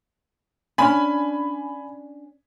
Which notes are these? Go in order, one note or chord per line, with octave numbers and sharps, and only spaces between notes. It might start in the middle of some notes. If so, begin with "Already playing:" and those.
C#4 D4 G#5 B5